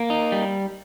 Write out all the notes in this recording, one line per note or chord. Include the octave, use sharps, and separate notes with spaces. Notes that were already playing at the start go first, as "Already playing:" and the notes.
Already playing: A#3
D#4
G3